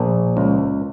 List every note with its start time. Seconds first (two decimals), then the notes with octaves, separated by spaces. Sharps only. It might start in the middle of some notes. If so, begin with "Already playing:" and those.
Already playing: A#1
0.37 C#2